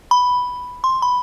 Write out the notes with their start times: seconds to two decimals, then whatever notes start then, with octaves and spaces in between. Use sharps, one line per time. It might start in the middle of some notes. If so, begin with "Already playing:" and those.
0.11 B5
0.84 C6
1.02 B5